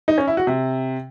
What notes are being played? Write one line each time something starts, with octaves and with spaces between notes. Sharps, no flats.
D#4
C#4
E4
F#4
C3